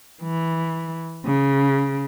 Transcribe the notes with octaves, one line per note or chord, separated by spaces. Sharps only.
E3
C#3